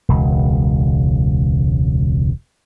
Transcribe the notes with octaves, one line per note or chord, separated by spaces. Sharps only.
E1 C#2